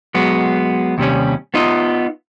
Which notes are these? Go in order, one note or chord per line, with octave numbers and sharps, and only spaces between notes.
F#3 G#3 B3
D#2 C3 G3 C#4
B3 D#4 F4 D#5